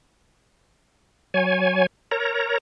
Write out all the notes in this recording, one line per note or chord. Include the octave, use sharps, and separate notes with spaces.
F#3 C#5 G#5
A#4 C#5 A#5